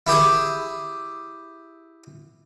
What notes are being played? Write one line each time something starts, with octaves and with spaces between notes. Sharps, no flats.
E4 G4 G#4